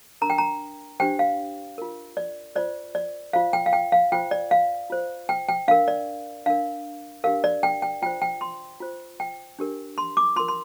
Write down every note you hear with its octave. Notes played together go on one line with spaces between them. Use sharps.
D4 A#4 A#5
G5
A#5
D4 G4 C5 G5
F5
F4 A#4
D5
F4 C5 D5
D5
F4 C5 F5
G5
F5
G5
F5
F4 C5 G5
D5
F5
F4 C5
G5
G5
D4 A#4 F5
D5
D4 A#4 F5
D4 G4 A#4 F5
D5
G5
G5
F4 C5 G5
G5
C6
F4 C5
G5
D4 G4 A#4
C6
D6
F4 A#4 C6
C6